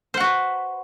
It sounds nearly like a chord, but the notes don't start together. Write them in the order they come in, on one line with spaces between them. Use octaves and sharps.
C5 F#5 F#4 B4